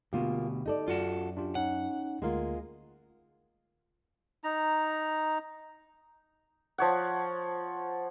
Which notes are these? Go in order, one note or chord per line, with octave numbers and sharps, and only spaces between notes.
D2 B2 A#3 F4 G4
D#4 A4 D5
F#2 F4 F#4 A4
D4 F4 G4
C#4 D#4 F#5
D2 G#3 A#3 F4 A#4
D#4 A#5
F3 C#5 F#5